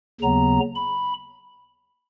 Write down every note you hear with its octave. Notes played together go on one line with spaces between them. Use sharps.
D#2 C#3 F#3 B3 A#5
B5